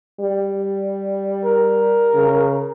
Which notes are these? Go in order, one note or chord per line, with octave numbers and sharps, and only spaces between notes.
G3
A#4
C#3